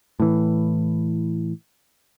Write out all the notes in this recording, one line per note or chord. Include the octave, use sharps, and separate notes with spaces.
A2 E3